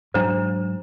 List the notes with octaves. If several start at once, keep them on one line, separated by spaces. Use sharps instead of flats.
G#2 F#3 D4 E4 C5